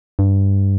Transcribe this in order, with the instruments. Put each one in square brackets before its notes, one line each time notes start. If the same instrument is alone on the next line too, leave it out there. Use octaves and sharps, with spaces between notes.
[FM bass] G2